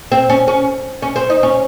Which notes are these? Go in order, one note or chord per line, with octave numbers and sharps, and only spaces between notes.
C4
C#4
C#4
C#4
C4
D#4
C#4